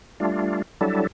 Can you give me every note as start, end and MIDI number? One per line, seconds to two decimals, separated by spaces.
0.20 0.62 55
0.20 0.62 57
0.20 0.62 62
0.20 0.62 65
0.81 1.07 54
0.81 1.07 55
0.81 1.07 62
0.81 1.07 64
0.81 1.07 69